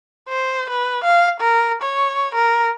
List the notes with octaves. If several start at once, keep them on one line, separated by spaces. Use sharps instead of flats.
C5
B4
F5
A#4
C#5
A#4